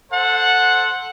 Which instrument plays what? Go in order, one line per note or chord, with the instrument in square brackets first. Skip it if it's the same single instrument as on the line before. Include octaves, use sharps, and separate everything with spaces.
[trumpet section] A4 C5 F#5